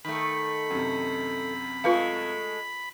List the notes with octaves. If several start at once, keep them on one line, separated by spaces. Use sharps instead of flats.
D#3 A3 B5
F#2 C3
G#3 A3 F4 B4 F5